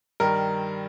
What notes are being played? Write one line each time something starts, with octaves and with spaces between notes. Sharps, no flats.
G2 D#3 G3 A#4